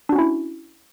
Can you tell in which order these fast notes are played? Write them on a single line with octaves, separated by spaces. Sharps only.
D4 F#4 C#4 E4